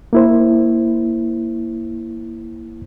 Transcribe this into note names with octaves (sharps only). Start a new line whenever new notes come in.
A#3 E4 C5